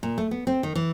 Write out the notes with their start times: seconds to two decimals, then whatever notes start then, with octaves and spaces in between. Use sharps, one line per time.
0.03 A#2
0.18 A3
0.31 B3
0.47 C4
0.63 D#3
0.75 E3